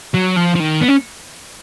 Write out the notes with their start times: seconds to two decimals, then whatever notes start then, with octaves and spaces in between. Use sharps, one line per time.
0.14 F#3
0.36 F3
0.55 F3
0.60 D#3
0.81 B3
0.89 C#4